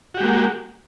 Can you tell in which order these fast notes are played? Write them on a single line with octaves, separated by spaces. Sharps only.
F#4 G4 G#3 A#3